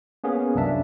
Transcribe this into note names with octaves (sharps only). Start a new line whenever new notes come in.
A#3 B3 C#4 G#4
C2 F#2 D4 E5